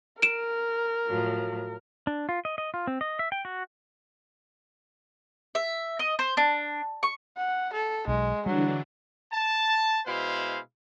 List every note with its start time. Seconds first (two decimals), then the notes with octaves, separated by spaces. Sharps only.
0.22 A#4 D7 E7
1.07 A2 F3 F#3
2.07 D4
2.29 F4
2.45 D#5
2.58 D#5
2.74 F4
2.87 C4
3.01 D#5
3.19 E5
3.32 G5
3.45 F#4
5.55 E5
5.99 D#5
6.19 C5
6.37 D4
7.03 C#6
7.37 F#5
7.73 A4
8.07 B1 G#3
8.46 D3 E3 F#3 G3 D4
9.32 A5
10.06 B2 G#3 E4 C5 F5 B5